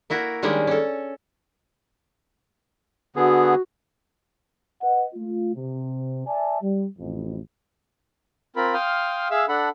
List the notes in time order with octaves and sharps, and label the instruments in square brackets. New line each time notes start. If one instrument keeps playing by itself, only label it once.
[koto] A#3 E4 F#4 A#4
D#3 G3 G#3 A#3 C#4 D4
C#4 A4
[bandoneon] D3 B3 G#4 [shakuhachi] F#4
[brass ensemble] B4 D#5 F#5
A3 F4
C3
D5 E5 G#5 A5
G3
A1 F2
[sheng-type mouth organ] C4 F4 A#4 B5
F5 G5 C6 D#6 F6
G#4 E5 F5 E6
D4 A4 F#5 B5